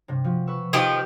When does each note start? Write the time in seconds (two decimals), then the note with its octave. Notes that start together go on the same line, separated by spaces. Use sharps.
0.08 G2 C3
0.24 F3 F#4
0.47 B4 C#6 E6
0.73 D#3 F3 G4